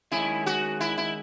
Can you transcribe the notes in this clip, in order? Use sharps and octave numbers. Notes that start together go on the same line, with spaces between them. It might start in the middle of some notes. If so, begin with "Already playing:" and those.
D#3 G#3 C#4 E4 G#4
F#4
E4
E4